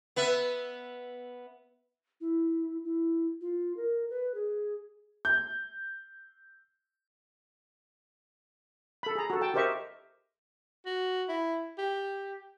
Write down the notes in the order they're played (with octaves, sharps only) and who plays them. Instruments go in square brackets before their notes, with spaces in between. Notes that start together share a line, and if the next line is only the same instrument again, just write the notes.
[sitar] B3 B4 E5
[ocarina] E4
E4
F4
A#4
B4
G#4
[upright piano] G6
[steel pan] A4 B5
G#4 A#5
F#4 A4
G5 A5
G4 A#4 C5 D#5 E5 C#6
[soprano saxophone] F#4
E4
G4